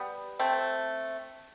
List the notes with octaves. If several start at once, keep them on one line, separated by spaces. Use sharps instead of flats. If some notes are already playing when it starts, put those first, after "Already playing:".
Already playing: G3 B3
A3 C4